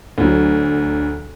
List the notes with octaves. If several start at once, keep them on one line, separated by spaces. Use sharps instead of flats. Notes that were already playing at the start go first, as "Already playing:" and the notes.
D2 F#3